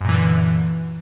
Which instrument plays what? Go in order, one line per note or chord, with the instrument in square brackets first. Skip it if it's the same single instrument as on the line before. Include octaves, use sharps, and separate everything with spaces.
[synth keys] F#2
A#2
E3
D3